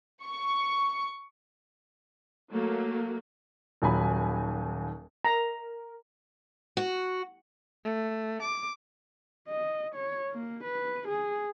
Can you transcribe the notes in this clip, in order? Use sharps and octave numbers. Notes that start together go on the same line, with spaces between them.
C#6
F#3 A3 A#3
D#1 D#2 F#3 G#5 B5
A#4 A#5
F#4
A3
D6
D#5
C#5
A#3
B4
G#4